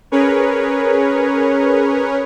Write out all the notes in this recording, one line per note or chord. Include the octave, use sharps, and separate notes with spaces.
C#4 G#4 A#4 B4 C#5